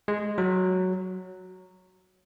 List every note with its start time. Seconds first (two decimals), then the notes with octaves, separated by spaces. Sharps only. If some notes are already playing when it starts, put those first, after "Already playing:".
0.08 G#3
0.38 F#3